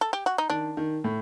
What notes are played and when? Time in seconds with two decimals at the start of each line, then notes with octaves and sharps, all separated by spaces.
0.01 A4
0.13 G4
0.26 F#4
0.38 D#4
0.50 D#3 D4
0.77 D#3
1.04 A2